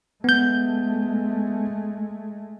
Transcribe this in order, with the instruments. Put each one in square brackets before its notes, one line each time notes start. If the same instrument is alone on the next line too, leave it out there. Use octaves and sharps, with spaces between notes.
[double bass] G#3 A3 [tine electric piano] B3 G6